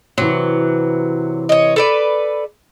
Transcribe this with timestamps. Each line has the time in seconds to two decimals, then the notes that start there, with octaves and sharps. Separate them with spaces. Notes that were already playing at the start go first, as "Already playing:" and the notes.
0.18 C3 E3 F#3
1.49 C#5 D#5
1.76 A4 B4 D5